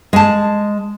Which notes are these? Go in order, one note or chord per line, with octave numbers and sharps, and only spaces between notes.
G#3 A5